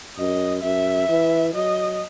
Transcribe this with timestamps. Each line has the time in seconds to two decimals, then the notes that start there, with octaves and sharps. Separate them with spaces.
0.17 F#2 D#5
0.63 F#2 E5
1.09 E3
1.54 F#3 D#5